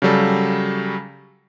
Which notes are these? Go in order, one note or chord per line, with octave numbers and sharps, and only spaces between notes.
C#3 F#3 G3 A4